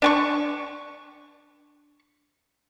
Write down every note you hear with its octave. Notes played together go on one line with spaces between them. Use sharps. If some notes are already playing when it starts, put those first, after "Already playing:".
D4 G#5 C#6